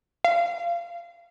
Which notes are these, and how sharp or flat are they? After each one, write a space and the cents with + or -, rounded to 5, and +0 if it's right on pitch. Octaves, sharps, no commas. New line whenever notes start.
F5 -20